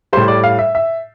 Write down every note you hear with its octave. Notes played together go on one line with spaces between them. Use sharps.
A2 G3 C5
D5
F5
E5
E5